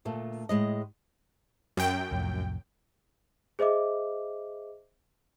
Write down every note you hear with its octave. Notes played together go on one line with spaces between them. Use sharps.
D2 A#2 A3
A2 G#3 D#5
F#2 G5
C2 F2 A2
G#4 C5 D#5 E5 D6